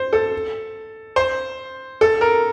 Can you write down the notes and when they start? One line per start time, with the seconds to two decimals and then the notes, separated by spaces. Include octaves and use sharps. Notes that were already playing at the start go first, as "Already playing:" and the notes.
Already playing: C5
0.13 A4
1.16 C5
2.01 A4
2.21 A#4